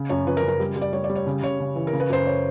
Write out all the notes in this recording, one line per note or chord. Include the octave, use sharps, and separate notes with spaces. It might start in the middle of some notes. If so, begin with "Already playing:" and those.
Already playing: C#3
F#2 C#5
F3 B4
A#4
C#3
A#4
G3
G3
D5
G3 C#5
D5
G3
C#5
C#3
C#3 C#5
C#3
E3
A#4
C#3
B4
F#2 C5
C#5